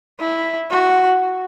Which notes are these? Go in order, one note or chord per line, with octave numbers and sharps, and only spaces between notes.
E4
F#4